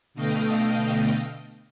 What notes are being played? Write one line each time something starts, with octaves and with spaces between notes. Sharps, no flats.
B2 D3 A3 D#5 F5 G5